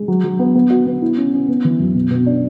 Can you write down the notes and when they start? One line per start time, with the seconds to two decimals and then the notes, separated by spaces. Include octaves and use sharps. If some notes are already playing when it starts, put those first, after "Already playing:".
Already playing: G#3
0.08 F#3
0.24 F#3
0.39 B3
0.55 B3
0.70 F#4
0.86 B3
1.02 E4
1.17 C#4
1.33 C#4
1.48 B3
1.65 E3
1.80 F#2
1.95 B2
2.10 B2
2.26 D4